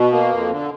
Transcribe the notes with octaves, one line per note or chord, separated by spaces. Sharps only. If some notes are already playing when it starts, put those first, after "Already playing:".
Already playing: B2
A#3
F2
D3